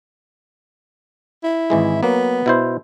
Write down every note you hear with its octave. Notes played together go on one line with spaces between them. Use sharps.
E4
G#1 E3 G#3
F#3 A#3 B3
B2 E4 C5